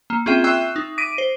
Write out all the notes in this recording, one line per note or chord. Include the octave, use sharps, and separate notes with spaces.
A#3
C4 C#4 F4 G#4 E5 G5
E5 G5 C#6 E6 F#6 C7
D#4
D6 A#6 B6 D7 D#7
C5